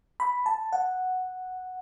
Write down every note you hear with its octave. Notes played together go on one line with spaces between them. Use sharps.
B5
A5
F#5